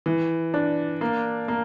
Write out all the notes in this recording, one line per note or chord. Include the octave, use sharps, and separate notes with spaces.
E3
D4
A#3
A#3